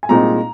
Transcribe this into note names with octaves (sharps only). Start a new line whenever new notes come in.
G#5
C2 A#2 G#3 C4 D#4 A#5